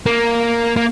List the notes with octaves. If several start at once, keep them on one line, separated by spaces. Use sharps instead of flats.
A#3
A#3